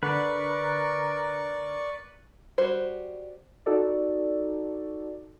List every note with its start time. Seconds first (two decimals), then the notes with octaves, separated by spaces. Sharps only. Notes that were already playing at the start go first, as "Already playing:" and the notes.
0.03 D3 A#4 B4 D5 C#6
2.58 G3 F#4 C5
3.66 D#4 F#4 A4 D5